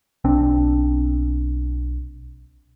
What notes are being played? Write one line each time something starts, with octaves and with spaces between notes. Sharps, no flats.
B1 C4 D4